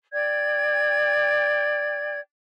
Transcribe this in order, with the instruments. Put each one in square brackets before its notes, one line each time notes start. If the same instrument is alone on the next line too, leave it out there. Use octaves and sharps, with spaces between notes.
[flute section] D5 G5 G#6